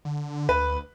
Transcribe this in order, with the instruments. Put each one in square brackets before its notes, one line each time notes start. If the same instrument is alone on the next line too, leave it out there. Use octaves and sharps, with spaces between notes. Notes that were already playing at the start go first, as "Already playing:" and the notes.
[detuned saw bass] D3
[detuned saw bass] D2 [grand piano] B4